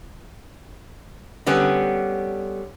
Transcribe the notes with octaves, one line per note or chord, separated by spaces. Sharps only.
D3 G3 B3 C#4